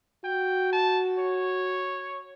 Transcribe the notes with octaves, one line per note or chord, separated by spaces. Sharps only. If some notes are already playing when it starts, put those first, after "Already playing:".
F#4 G5
A5
C#5